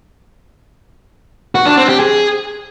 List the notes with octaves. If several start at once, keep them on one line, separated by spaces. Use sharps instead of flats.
F#4
D4
C4
G4
G#4